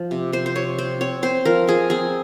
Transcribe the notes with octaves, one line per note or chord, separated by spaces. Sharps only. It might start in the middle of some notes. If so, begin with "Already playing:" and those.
Already playing: F3
C3
C3 C5
C5
C3 C#5
C4 C5
C4 C#5
C4 C5
F3 A#4
F3 G#4
C4 G#4